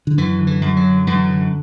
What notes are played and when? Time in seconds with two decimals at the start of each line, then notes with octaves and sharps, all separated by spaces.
0.07 D3
0.17 F#2 E3
0.39 D3
0.47 E3
0.61 F#2
0.76 F#3
0.84 D3
1.07 F#2 E3
1.29 D3